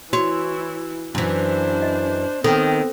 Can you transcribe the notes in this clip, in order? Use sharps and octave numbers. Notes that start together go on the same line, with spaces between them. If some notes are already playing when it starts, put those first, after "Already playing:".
E3 E4 F#4 C#5
F#2 E3 D4 C5
D#5
D#3 B3 C4 A4